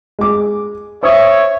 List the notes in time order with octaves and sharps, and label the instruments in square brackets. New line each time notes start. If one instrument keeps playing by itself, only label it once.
[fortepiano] G#3 D6
[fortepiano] C5 D#6 [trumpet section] C#5 E5